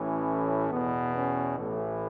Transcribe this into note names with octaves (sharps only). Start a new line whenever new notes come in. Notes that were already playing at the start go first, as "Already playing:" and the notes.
Already playing: A1 A2 E3 C#4
E2 B2 B3
C#4
A1 A2 E3 A3